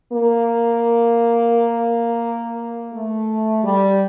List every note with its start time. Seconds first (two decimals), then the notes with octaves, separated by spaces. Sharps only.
0.12 A#3
2.94 A3
3.64 G3